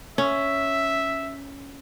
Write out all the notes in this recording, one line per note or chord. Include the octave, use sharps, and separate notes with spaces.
C#4 E5